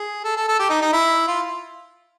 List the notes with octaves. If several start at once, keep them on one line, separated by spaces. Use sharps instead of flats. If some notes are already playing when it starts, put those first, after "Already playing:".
Already playing: G#4
A4
A4
A4
G4
D#4
D#4
E4
F4